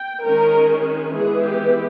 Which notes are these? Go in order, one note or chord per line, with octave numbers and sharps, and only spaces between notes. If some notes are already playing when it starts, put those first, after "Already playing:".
Already playing: G5
D#3 G#3 C#4 A#4
E3 G#3 B3 G#4
G4